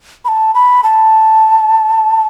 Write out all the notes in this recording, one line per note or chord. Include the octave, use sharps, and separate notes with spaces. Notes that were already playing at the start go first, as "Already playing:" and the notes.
B5
A5
B5
A5